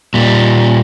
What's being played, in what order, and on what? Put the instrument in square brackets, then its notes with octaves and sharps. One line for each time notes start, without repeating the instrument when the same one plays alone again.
[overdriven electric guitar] A#2 G3